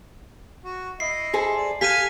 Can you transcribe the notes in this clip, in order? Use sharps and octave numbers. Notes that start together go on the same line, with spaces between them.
F#4
E4 D#5 C7
G#4 A4 C5
D5
G4 A4 F5 G#5 B6 D#7